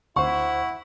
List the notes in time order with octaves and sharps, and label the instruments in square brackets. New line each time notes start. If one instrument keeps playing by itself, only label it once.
[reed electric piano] D2 C5 [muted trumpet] E4 [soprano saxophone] F#5 [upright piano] C#6